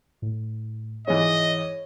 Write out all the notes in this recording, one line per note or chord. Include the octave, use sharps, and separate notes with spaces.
A2
G#2 E3 C#5 D#5